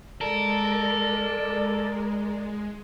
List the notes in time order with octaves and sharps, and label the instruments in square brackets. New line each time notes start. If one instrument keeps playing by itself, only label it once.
[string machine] G#3 [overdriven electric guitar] A4 [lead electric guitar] A#4 [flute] D5